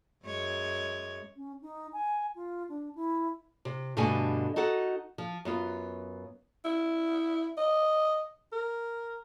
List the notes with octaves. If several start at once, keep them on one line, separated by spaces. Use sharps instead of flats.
F#2 G#3 C#5
C#4
D#4
G#5
F4
D4
E4
C3
G2 B2 D3 A3 G4 G#5
D#4 F#4 A4 F#5
F3
F#2 B3 F4
E4
D#5
A#4